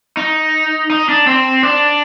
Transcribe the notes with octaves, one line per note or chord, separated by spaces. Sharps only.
D#4
D#4
D4
C4
D4